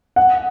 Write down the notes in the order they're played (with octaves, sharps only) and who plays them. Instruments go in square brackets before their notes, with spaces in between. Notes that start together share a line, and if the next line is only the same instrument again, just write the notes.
[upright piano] F#5